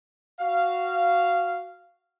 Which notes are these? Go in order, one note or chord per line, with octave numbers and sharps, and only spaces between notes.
F#4 F5